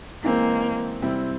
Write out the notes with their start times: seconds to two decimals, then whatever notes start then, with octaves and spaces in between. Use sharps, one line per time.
0.24 E3 G#3 A#3 C4
1.02 C3 G3 C4 E4